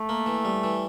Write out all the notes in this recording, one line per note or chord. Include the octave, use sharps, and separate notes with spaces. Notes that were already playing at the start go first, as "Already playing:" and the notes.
Already playing: A3
A#3
E3
G3
E3